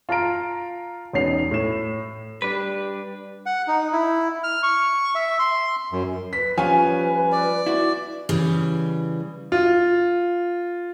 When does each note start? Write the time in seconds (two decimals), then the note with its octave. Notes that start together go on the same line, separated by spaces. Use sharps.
0.09 F4 A5 A#5 D7
1.13 E1 B3 C#4 D#4 C7 F7
1.51 A2 E7
2.42 G3 D4 G4 B4
3.46 F#5
3.68 D#4
3.93 E4
4.44 F6
4.63 C#6
5.15 E5
5.39 C6
5.92 F#2
6.33 B4 B6
6.58 F3 G3 C#4 F4 G#5
7.32 D5
7.66 E4 F#4
8.29 C#3 E3 G3
9.52 F4